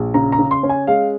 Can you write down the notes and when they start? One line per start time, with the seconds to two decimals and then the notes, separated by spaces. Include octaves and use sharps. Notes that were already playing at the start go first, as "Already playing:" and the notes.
Already playing: A#1
0.14 C#3 A#5
0.32 A#5
0.39 C#3
0.51 C6
0.63 C#4
0.69 G#5
0.87 G#3 F5